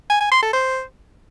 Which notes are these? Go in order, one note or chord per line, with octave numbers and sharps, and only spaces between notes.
G#5
G#5
C6
A4
C5